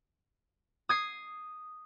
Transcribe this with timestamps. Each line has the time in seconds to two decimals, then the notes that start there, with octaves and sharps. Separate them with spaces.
0.89 D#6 G#6 C7